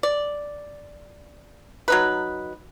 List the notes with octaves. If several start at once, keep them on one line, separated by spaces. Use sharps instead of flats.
D5
F#3 D#4 B4